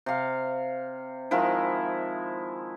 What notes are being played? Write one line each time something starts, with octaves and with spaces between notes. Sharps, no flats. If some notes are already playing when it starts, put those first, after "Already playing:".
C3 F5
D#3 F3 G#3 E4